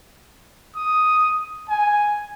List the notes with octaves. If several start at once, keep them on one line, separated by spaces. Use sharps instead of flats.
D#6
G#5